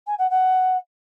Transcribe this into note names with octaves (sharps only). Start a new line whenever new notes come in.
G#5
F#5
F#5